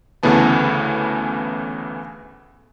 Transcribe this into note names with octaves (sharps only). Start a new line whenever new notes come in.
D2 C#3 E3 A3 B3 A5